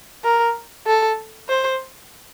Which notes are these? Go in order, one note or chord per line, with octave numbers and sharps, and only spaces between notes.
A#4
A4
C5